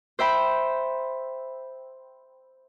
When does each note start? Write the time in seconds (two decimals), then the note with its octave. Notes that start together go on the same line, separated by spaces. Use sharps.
0.19 C5 E5 G5 B5